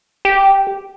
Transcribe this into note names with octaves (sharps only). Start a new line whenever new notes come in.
G4